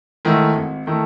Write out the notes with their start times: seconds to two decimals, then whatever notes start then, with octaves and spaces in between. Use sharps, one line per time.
0.25 G#2 D#3 A3 E4
0.55 G#1
0.87 D#3 A3 E4